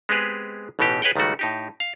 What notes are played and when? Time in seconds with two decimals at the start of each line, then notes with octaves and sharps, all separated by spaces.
0.09 G#3 B3 C4 G4 G#4 B4
0.79 A1 B2 E3 D#4 G4
1.02 G#4 B4 C#5 D#5 F#5 G5
1.16 C#2 D#3 G3 A3 F#4
1.39 A2 D#4 G4
1.80 F5